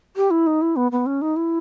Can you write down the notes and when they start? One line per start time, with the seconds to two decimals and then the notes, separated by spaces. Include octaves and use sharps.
0.17 G4
0.31 E4
0.47 D#4
0.62 E4
0.76 B3
0.92 B3
1.06 C#4
1.22 D#4
1.36 E4